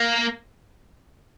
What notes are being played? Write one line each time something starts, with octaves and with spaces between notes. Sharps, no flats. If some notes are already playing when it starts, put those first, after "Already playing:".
Already playing: A#3